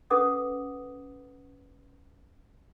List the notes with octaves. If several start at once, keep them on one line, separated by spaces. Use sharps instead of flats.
C#4 A4 B4 F#5 D6 D#6